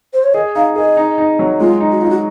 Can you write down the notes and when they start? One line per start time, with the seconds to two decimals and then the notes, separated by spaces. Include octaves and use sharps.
0.13 C5
0.24 C#5
0.34 G#4 D#5
0.55 D#4 F5
0.76 G#4 D#5
0.97 D#4
1.18 D#4
1.39 F#3
1.60 G#3 F4
1.80 D#4
1.92 F#4
2.02 D#4 F4
2.10 F#4